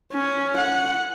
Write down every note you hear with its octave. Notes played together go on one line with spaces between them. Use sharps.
C#4
F#5